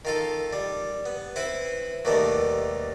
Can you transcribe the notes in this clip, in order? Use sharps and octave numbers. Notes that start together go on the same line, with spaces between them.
D#3 F4 A4
G3
B3
C4 E4 B4
D#2 B2 D#3 G3 A3